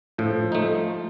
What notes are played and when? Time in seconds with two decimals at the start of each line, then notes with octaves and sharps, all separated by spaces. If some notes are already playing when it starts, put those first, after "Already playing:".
0.18 A2 F3
0.52 A3 D#4